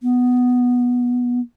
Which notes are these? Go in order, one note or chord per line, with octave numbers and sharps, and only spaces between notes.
B3